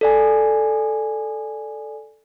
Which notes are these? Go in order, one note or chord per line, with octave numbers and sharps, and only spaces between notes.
A4 D5 G#5